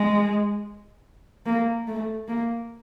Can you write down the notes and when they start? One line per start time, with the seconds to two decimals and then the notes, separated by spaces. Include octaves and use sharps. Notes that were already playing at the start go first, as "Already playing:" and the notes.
Already playing: G#3
1.46 A#3
1.87 A3
2.28 A#3